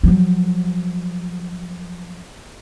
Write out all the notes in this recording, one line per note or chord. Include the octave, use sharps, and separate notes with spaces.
F3 F#3